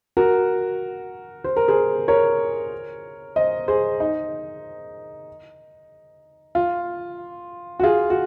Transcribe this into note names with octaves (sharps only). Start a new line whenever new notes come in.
F#4 A#4
C5
A#4
G#4 C5
A#4 C#5
C5 D#5
G#4 C5
D#4
F4
F#4
F4 G#4
F#4